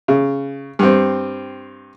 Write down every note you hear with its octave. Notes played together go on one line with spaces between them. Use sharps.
C#3
G2 C4